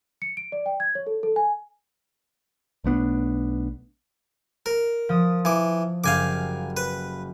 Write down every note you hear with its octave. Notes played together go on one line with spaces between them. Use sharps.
C#7
D7
D5
G5
G#6
C#5
A4
A4
G#5
B1 A3 B3 D4
A#4
F3 D#6
E3 D6
F#1 G4 F5 G#5 D6
B4